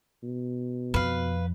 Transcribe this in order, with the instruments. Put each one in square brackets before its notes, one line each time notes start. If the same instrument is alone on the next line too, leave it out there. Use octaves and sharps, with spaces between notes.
[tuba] B2
[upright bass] F2 [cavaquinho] B4 F5